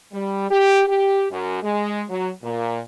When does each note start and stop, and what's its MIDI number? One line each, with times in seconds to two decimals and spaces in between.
0.13 0.48 55
0.50 0.82 67
0.87 1.27 67
1.31 1.61 42
1.63 2.04 56
2.09 2.30 54
2.43 2.80 46